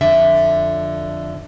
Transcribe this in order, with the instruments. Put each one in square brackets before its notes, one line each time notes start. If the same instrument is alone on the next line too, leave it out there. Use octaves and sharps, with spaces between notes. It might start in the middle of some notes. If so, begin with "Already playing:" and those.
[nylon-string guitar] F2 D3 E5